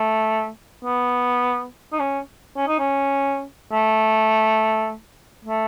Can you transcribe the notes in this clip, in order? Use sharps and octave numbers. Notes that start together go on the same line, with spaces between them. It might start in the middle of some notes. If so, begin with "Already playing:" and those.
Already playing: A3
B3
D#4
C#4
C#4
D#4
C#4
A3
A3